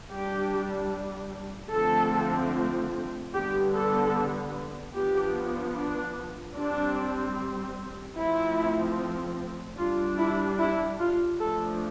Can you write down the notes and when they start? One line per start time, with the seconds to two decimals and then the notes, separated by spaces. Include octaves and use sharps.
0.11 G3 D4 G4
1.72 D3 F3 A3 C4 A4
3.33 D3 G3 B3 G4
3.74 A4
4.95 F3 B3 D4 G4
5.75 D4
6.56 G3 C4 D4
8.17 F3 A3 C4 E4
9.78 G3 D4 F4
10.18 E4
10.59 E4
10.99 F4
11.40 F3 A3 D4 A4